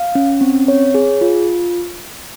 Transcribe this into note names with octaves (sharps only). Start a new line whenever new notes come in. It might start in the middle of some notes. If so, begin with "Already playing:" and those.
Already playing: F5
C#4
C4
C#5
G#4
F4